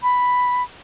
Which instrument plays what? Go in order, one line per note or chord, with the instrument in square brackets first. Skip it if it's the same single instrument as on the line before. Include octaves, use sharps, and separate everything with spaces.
[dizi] B5